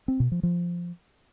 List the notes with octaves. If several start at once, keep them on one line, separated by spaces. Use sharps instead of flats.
C4
B2
F3
F3